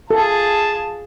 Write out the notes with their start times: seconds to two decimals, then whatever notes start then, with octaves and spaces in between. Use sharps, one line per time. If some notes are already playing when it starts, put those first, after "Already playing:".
0.11 F4 G#4 A4 A5